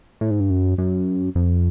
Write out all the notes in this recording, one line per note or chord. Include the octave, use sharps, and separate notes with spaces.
A2
G#2
G2
F#2
F#2
F2